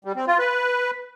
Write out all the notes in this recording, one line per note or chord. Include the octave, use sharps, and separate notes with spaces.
G3
C4
F4
B4